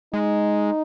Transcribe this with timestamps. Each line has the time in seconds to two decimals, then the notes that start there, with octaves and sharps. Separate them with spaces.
0.13 G#3 D#4